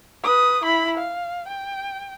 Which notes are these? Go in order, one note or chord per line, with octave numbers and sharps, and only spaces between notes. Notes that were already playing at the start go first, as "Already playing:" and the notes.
B4 D#6
E4 B5
F5
G5